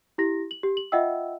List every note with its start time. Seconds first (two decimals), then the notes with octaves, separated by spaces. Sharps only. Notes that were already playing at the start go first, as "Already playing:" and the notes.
0.18 E4 G4 A#6
0.51 F#7
0.63 G4
0.77 F#7
0.92 F4 D#5 E5 F#5 G5 E6